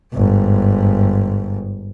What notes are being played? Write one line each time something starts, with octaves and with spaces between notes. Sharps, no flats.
G1 G#2